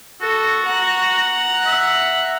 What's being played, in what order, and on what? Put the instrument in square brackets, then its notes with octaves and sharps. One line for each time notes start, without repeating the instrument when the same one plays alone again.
[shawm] F#4 [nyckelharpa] A4
[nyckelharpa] F#5 A#5
[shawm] E5